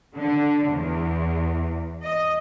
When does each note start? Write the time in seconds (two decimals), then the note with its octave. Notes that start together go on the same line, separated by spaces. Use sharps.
0.17 D3
0.69 E2
2.04 D#5